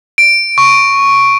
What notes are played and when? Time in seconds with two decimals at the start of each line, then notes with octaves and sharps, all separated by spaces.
0.18 D7
0.58 C#6